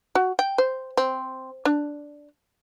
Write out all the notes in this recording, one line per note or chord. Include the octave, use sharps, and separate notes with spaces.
F#4
G5
C5
C4
D4